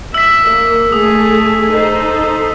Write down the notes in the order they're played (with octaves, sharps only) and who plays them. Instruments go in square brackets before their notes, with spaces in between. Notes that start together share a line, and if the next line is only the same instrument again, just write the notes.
[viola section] E5 [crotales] E6 B6
[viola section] A#3
[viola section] A3 G#4 A4 [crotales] D#6
[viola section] D#4 A4 C5